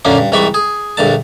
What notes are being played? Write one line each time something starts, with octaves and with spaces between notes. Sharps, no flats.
F#2 A#2 D3 A#3 C#4
G2
C2 G#2 E3 G3 B5 C#6
G#4
A#1 G2 D3 A5